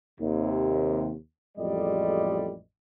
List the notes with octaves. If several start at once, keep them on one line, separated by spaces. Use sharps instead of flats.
D#2 C3
A1 F2 G3 G#3 D5 D#5